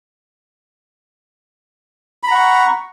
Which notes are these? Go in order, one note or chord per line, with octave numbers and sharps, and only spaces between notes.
F#5 A#5 B5 C#6